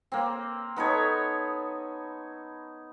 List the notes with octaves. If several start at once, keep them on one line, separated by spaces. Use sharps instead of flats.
A#3 C4
B3 D#4 A4 C#5